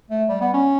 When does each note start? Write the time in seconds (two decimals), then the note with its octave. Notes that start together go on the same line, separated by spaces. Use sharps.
0.10 A3
0.29 G3
0.41 B3
0.54 C#4